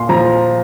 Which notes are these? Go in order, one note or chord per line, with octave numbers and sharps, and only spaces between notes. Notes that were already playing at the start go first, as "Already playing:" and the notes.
Already playing: A#2 C6
F3 A#5